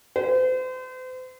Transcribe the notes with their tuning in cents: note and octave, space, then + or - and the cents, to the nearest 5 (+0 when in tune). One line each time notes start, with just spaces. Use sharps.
C5 -40